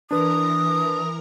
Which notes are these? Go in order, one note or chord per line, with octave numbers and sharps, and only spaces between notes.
E3 D4 A#4 B4 A#5 D#6